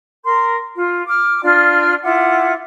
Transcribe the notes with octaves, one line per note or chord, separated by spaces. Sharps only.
A#4 C6
F4
D6 F6
D4 F4 D5 F6
E4 F4 F#5 D6